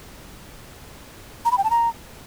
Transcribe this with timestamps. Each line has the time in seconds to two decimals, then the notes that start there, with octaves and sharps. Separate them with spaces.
1.45 A#5
1.51 B5
1.58 G5
1.64 A5
1.70 A#5